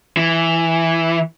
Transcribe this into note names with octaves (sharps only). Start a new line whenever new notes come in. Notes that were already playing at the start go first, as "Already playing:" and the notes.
E3